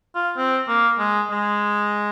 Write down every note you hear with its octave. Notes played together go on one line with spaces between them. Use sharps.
F4
C4
A#3
G#3
G#3